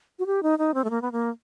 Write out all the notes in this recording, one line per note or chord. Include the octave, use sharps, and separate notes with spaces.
F#4
G4
D#4
D#4
C4
A3
A#3
B3
A#3